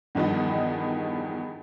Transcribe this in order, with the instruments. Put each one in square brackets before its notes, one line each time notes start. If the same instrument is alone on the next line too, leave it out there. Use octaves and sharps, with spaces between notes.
[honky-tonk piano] E2 G2 D#3 F3 D#5